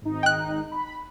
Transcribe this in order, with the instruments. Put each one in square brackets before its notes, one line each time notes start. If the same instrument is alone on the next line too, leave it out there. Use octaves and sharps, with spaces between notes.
[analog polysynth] G#1 D#4
[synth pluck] G5 F#6
[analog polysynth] B5